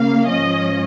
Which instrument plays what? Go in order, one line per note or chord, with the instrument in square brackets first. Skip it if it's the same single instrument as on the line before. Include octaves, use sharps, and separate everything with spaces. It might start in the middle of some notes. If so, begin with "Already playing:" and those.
Already playing: [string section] C#3 A#3 F5
G#2 F3 C#4 D#5